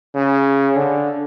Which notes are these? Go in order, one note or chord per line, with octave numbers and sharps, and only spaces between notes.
C#3
D3